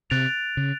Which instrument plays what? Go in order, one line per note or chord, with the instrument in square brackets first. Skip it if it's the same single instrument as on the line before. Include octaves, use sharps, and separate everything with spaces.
[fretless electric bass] C3 [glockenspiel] F#6 A6 D7 F7
[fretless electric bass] C#3